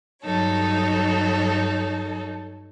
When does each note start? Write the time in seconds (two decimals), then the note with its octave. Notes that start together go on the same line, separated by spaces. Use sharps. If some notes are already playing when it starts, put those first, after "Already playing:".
0.23 G2 F#3 D#4 A4 C#5